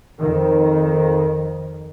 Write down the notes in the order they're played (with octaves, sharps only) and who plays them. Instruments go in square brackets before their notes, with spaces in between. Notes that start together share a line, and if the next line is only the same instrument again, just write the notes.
[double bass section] F2 D#3